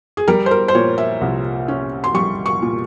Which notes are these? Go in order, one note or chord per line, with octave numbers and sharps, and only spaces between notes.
G#4
G3 A#4
C5
A#4
C5
A#2 C#5
E5
C2
C#4
C6
G3 C#6
C#6
A#2